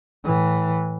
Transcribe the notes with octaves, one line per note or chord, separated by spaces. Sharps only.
A2 E3